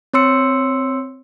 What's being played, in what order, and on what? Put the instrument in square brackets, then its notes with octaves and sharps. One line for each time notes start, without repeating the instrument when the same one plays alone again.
[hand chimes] C4 C#5 C6 E6 C#7